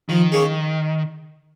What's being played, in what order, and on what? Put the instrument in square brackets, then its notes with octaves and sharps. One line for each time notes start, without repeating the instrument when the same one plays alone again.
[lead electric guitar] D#3 [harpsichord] F3
[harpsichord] A#3 C#4 G#4